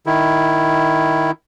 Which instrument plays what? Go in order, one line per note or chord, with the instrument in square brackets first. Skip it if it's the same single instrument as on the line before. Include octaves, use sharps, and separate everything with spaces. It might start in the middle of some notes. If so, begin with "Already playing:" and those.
[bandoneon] D#3 E4